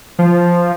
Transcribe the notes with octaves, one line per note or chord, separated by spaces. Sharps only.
F3